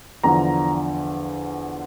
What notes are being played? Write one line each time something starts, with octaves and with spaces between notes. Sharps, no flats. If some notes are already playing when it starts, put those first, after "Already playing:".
E2 D3 F3 A#5